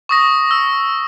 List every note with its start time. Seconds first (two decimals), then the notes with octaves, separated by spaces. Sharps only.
0.09 C#6 D#6 A#6
0.51 E6